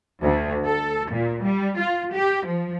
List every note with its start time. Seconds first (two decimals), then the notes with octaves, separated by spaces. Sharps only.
0.23 D2
0.65 A4
1.10 A#2
1.43 G3
1.77 F4
2.13 G4
2.46 F3